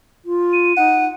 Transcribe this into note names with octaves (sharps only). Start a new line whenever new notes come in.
F4
D#7
D#4 F#5